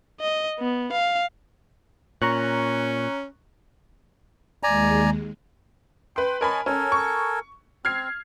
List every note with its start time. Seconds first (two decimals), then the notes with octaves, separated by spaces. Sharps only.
0.20 D#5
0.59 B3
0.92 F5
2.22 A#2 C#4 A#5 C#6 F#6
4.63 D#2 G#3 D5 G#5 A#5
6.16 B4 G5 C6
6.41 A#4 C#5 D#5 G#5 A5 B5
6.66 C#4 A4 A#4 G#5
6.92 C#6
7.85 C4 F6 G#6 C7